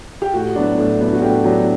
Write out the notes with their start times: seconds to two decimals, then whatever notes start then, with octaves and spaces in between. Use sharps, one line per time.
0.22 G4
0.34 A2 F#4
0.55 F#3 B3 D4
0.78 A2
1.00 F#3 B3 D4
1.13 F#4
1.22 A2 G4
1.44 F#3 B3 D4